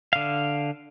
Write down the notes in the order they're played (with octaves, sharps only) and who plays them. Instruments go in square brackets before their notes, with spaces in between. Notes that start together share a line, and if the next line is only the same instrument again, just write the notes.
[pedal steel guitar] D3 F5